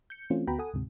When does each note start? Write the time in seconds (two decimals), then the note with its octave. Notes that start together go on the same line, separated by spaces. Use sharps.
0.10 G6 C#7
0.30 E3 A3 C4 C#4 F4
0.47 D2 B3 F#4 G5 A#5 B5
0.59 A4 F#5 G#5 D#6
0.73 D2 G#2 C3